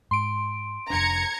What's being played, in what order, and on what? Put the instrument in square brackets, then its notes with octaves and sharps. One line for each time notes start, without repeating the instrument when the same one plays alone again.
[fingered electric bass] G#2 [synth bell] C6 D7
[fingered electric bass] F1 F2 D4 [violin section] A#5 G#6 C#7